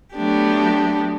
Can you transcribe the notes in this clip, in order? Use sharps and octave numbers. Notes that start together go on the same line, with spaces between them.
F#3 A3 B3 D4 G4